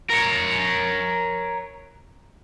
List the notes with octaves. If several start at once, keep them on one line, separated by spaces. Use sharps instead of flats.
A#4 C#5